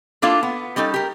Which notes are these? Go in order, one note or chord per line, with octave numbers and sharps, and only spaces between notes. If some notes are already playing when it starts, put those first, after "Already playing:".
A#3 D4 E4 F4 A4 F5
B3
G3 C#4 D#4 A4
G4 A#4